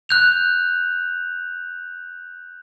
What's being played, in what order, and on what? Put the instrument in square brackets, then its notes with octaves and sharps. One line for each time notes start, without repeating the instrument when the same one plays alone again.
[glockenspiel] F#6 G6 F7